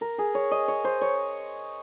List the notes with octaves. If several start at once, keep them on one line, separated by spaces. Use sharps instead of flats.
A#4
G#4
C#5
D#5
C#5
C5
C#5